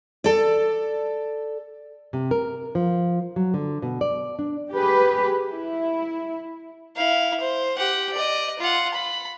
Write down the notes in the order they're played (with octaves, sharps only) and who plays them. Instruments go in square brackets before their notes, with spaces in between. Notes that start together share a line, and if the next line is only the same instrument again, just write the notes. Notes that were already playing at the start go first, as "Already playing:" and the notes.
[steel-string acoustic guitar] A4 D5
[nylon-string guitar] C3
A#4
F3
F#3
D3
B2
D5
D4
[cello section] G4 G#4 B4
E4
[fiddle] E4 F5
C5
G4 F#5
D5 D#5
F4 F#5
B5